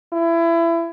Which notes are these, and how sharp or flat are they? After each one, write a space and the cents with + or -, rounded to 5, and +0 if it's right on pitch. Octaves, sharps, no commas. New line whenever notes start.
E4 +25